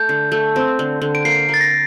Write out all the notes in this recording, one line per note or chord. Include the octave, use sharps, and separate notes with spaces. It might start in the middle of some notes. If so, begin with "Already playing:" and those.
Already playing: A3 G6
D3
A3
C4
D3
D3
D7
A#3 C7
A#3
A6
A#6